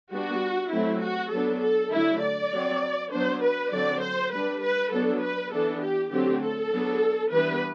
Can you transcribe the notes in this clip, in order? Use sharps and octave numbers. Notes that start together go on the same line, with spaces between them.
G3 B3 D4 F#4
F#3 A3 C4 E4
F#4
F#3 B3 D4 A4
A4
D3 F#3 A3 E4
D5
F#3 C4
F#3 B3 D4 C5
B4
D3 F#3 C4 D5
C5
G3 D4 B4
B4
F#3 B3 D4 A4
B4
E3 B3 D4 A4
G4
D3 F#3 A3 C4 G4
A4
F#3 B3 D4
E3 G3 B3 D4 B4